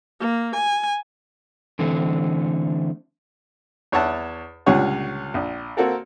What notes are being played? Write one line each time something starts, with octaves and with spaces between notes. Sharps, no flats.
A#3
G#5
D3 E3 A3 C4
E2 C#5 E5 F#5 A5
C#2 A#2 D3 G3 C#5 F#5
A#1
A#3 C4 F#4 A4 A#4